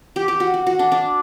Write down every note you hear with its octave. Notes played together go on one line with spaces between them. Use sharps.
G4
G4
F#4
F#4
F#4
D4
D4